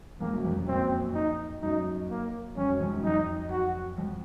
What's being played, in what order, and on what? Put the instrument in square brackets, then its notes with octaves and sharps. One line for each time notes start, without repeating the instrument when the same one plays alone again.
[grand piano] F2 G#2 [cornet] A#3
[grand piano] F#2
F2
F#2
[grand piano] F#2 A#2 [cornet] C4
[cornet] D#4
[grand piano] F#2 [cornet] D#4
[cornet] A#3
[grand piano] F2 [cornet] C#4
[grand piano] F#2
F2 G#2
F#2
[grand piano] F2 [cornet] D#4
[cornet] F#4
[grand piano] F2